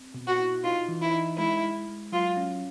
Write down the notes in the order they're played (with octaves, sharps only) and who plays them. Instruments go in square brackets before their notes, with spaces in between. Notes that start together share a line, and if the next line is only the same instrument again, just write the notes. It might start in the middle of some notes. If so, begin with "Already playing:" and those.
Already playing: [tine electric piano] C4
B2
[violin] F#4
[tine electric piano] E4
[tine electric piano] D#4 [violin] F4
[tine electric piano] E3
[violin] E4
[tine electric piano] D#4
[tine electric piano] G#3 [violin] E4
[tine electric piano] G#3
G#3
[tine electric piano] F#3 [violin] F4
[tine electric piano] C#4